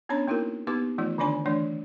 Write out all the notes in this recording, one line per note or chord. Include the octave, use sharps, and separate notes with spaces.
B3 C#4 D4 C#5 A#5 B5
A#3 D#4 E4 F#4 A#4
B3 D#4 G4 B4 D6
E3 F3 A3 D#4 F4
D3 D#3 D4 D5 G#5 B5
E3 A3 D4 D5